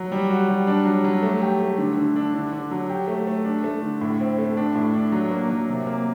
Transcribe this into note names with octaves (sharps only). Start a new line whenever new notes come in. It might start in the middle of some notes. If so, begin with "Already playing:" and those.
Already playing: F#3
G3
F#4
G3
D4
F#3
F#3
A3
G4
A3
D3
D3
D4
D3
D3
F#3
G4
A3
A3
D4
A3
D3
A2
C4
A3
D4
A2
D4
F#3
A#3
F#3
C3
A#3